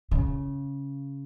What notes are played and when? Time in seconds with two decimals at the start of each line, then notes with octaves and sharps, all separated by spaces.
0.11 C#3